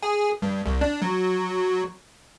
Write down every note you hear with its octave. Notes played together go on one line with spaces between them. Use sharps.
G#4
G2
C2
D4
F#3